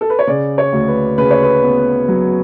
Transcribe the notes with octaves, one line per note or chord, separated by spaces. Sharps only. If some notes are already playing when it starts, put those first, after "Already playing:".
A4
B4
C#5
C#3 D5
C#5
D2
B4
C#3 B4
C#5
B4
B3
F#3